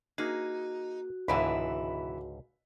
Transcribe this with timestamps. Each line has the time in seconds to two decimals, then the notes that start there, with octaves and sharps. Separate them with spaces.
0.18 A#3 D#4 F#4 G#4
1.28 C#2 G#2 B2 D3 E3 E4 B5